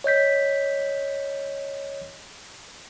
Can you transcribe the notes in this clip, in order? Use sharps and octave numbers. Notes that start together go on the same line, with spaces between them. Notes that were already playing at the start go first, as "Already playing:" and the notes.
C#5 D#5 G6 B6